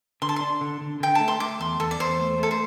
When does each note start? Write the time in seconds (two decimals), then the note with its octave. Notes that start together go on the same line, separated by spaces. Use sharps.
0.22 D3 C6
0.29 A5
0.36 D4 C6
0.61 D3
0.81 D3
1.00 D3 G5
1.15 A3 A5
1.28 C6
1.40 A3 D6
1.60 E2 C6
1.80 E2 A4
1.91 D5
2.00 E2 C5
2.19 A3
2.39 A3 A4
2.51 C5